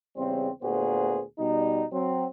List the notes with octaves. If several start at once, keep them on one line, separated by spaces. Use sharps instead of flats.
E2 C#3 G3 C4
D2 A#2 B3 F#4 G#4 C5
B2 G3 D#4
F#3 C4